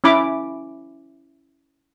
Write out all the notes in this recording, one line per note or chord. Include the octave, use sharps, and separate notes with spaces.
C#4 E4 B5 D6